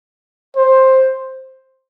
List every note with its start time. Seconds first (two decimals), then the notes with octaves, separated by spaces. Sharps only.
0.57 C5